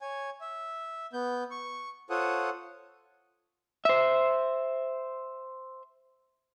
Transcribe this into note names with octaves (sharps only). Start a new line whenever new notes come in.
C#5 G#5
E5
B3 G6
C#6
F4 A4 C5 C#5 F#5 D#6
C5 E5